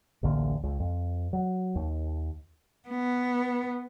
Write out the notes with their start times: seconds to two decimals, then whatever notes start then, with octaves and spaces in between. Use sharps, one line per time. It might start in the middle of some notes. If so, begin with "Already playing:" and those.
0.23 A1 D2 D3 A#3
0.63 C#2
0.80 F2
1.33 F#3
1.75 D#2
2.89 B3